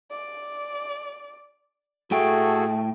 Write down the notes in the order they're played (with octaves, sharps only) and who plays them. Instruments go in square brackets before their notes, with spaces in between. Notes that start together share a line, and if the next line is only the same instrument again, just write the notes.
[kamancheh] D5
[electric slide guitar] A2 G5 [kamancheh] A3 [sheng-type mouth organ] F#4 G#4 A4